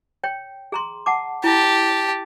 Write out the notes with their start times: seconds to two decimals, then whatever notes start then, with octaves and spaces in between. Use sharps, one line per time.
0.24 C#5 G5
0.72 G#4 A#5 C6
1.06 F#5 A5 D6
1.44 E4 G4 A5